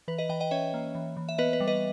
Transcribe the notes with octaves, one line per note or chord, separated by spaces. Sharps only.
E3 B4
B4 D#5
E3 D#5 G5
D#5 G5
C#4 C#5 E5
A#3
E3
E3
E5
B3 B4 D#5
B4
G3
B4 D#5